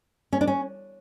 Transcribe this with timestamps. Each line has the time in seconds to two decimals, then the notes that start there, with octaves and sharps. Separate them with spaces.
0.33 C#4
0.41 D4
0.47 C#4